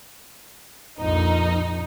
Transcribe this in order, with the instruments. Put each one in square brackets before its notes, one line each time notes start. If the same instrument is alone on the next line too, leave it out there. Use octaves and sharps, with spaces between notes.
[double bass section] A#1 F2 [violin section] D#4